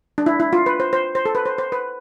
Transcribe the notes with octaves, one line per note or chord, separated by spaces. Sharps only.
D4
E4
E4
F4
B4
C5
C5
C5
A4
B4
C5
C5
B4